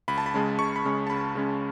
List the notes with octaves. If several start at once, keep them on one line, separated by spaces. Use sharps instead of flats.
C#2 B5
A5
B5
C#3 G#3 C#4
C#2 C#6
B5
C#3 G#3 C#4
A5
C#2 B5
C#3 G#3 C#4